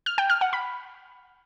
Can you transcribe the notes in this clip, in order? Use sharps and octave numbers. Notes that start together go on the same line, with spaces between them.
F6
G5
F6
F#5
B5